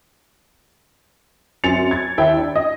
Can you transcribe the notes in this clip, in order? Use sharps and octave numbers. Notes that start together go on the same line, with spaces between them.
F#2 C4 G#5 A6 C#7 F7
G#6 A6
D#2 E4 G5
D4
D#5